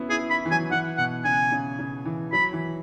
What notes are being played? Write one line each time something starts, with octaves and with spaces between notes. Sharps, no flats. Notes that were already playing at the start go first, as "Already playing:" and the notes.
Already playing: B3 C#4 E4 F#4
E4 G#4
E4 B5
E3
F#3 G#5
E3 F#5
B2 F#5
C#3 G#5
C#3
C#3
E3
F#3 B5
E3